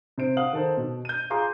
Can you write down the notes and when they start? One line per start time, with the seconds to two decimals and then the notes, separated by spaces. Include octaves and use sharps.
0.18 C3 C5 D7
0.37 F5 F#5 D#6 F#7
0.53 D#3 A4 C5
0.77 B2
1.05 G6 D#7
1.30 F4 G#4 A#5 C6 D6